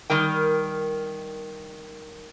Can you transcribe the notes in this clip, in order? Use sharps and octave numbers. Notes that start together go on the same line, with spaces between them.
D#3 G3 A#4 G5